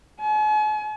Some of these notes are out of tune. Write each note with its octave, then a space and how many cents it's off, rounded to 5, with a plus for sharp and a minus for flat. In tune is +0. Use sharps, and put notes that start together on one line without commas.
G#5 +45